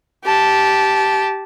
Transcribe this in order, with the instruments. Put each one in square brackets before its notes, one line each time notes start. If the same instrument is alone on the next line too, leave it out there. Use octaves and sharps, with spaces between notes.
[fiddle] G4 A5